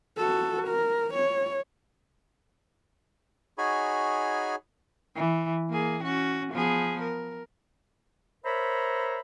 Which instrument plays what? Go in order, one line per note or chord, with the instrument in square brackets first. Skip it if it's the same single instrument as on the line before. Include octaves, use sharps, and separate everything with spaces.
[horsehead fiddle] F#4 A4
A#4
C#5
[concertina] D#4 F#4 G#4 C#5 G#5 B5
[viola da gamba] E3
A#3 G#4
C#4 F#4
F3 B3 G#4
A#4
[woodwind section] A#4 C5 C#5 E5 A#5 B5